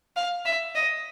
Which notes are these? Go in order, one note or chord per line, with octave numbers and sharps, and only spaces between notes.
F5
E5
D#5